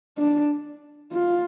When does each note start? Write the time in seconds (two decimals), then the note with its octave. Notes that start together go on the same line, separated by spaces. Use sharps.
0.18 D4
1.13 F4